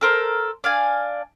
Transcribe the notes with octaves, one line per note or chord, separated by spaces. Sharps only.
A4 A#4 C5
D4 F5 G#5